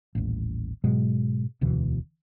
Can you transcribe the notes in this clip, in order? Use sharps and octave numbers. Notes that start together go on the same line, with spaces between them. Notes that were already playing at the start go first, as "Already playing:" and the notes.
D#1 A1
G#2 B2 F#3 G#3
E1 D2 B2 E3